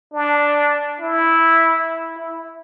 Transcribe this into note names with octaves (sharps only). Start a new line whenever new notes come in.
D4
E4
E4